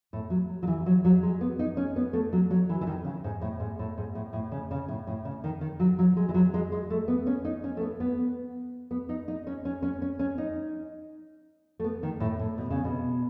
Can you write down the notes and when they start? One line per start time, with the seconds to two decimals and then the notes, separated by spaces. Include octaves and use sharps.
0.13 A2
0.30 F#3
0.63 F#3
0.67 E3
0.86 F#3
1.05 F#3
1.23 G#3
1.41 B3
1.59 D#4
1.77 C#4
1.96 B3
2.13 A3
2.33 F#3
2.51 F#3
2.69 E3
2.81 E3
2.87 D#3
3.05 C#3
3.24 G#2
3.42 A2
3.60 G#2
3.79 A2
3.98 G#2
4.15 A2
4.33 A2
4.52 C#3
4.71 C#3
4.88 A2
5.07 A2
5.25 C#3
5.44 D#3
5.61 D#3
5.80 F#3
5.99 F#3
6.17 G#3
6.29 E3
6.34 F#3
6.54 G#3
6.72 G#3
6.90 A3
7.08 B3
7.27 C#4
7.45 D#4
7.64 C#4
7.77 A3
7.81 B3
8.00 B3
8.91 B3
9.09 D#4
9.28 D#4
9.47 C#4
9.65 C#4
9.82 C#4
10.02 C#4
10.19 C#4
10.38 D#4
11.79 A3
11.84 B3
12.03 D#3
12.20 A2
12.39 A2
12.58 B2
12.70 C#3
12.84 B2